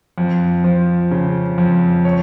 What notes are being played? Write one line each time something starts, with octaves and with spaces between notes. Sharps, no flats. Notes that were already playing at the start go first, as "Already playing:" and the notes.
F2
F3
C#3
F2
C#5